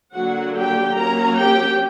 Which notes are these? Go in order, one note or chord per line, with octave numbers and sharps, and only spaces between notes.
D3 F#3 A#3 F#4 F#5
G4 G5
F#3 A#3 C#4 A#4 A#5
G4 G5